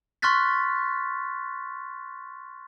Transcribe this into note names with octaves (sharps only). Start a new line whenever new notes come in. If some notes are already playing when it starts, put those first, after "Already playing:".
C6 C#6 F6 F#6 A6 B6